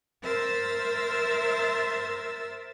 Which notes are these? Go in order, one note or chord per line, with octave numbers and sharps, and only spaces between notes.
A#4 C5 E5 E6 A6